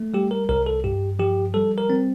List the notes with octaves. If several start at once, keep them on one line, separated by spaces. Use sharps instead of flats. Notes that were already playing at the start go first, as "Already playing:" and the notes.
Already playing: A3
G3 G4
A#4
C2 A#4
A4
G2 G4
F3 G4
G3 A4
A#4
C4